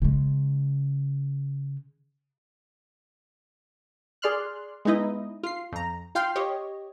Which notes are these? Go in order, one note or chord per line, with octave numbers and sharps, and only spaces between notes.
C#3 G#3
G#4 D5 C6 F6 F#6
G#3 B3 D#4 E4 D#5
F4 C7
F2 A#5
F4 F5 G5 C6 F6 C7
G4 C#5 D#5